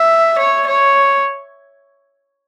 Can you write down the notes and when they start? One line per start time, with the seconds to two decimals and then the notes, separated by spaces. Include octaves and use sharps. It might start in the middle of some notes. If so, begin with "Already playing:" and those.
Already playing: E5
0.39 C#5
0.67 C#5